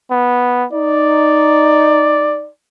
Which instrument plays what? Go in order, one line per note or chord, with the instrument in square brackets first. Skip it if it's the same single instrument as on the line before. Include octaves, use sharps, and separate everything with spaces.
[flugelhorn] B3
[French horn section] D#4 [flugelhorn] D5